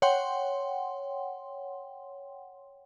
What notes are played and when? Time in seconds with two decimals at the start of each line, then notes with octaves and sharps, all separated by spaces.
0.02 C#5 F#5 G5 C6